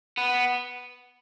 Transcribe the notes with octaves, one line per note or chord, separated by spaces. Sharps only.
B3